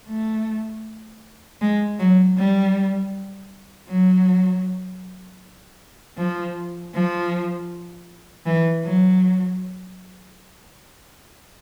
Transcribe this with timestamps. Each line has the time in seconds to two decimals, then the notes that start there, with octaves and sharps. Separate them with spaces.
0.08 A3
1.61 G#3
1.99 F#3
2.37 G3
3.89 F#3
6.17 F3
6.95 F3
8.46 E3
8.84 F#3